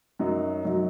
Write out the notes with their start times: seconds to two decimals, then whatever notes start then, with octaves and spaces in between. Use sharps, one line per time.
0.19 F#2 F#3 D#4
0.65 F#2 F#3 D#4